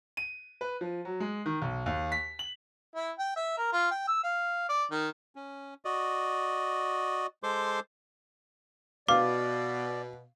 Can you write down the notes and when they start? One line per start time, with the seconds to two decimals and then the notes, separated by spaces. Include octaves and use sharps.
0.17 D#7
0.61 B4
0.81 F3
1.05 F#3
1.20 G#3
1.46 D#3
1.62 B1
1.86 D#2
2.12 B6
2.39 F#7
2.95 E4
3.19 G5
3.36 E5
3.58 A#4
3.73 F4
3.91 G5
4.08 E6
4.24 F5
4.69 D5
4.91 D#3
5.36 C#4
5.85 F#4 D5 D#5
7.43 G#3 A4 C5 C6 D6
9.08 B2 D5 F5 D6